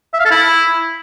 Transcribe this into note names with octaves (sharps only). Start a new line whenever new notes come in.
E5
F5
A4
E4